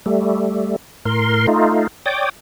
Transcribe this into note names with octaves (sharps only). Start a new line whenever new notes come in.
G3 A3
A2 A#4 C6
A3 D#4 F4
C#5 D5 G5 D6 D#6